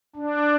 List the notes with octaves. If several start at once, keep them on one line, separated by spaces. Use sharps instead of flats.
D4